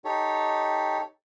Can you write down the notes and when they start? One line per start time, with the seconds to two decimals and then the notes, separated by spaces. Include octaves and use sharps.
0.05 D#4 G4 A4 C#5